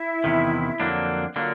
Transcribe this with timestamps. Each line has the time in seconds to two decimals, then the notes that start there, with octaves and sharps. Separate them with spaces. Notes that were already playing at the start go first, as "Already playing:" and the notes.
Already playing: E4 E5
0.24 E2 C3 D#3
0.80 F2 D3 F#3 A#3 D4
1.36 D3 F#3 A#3 D4 F4 F5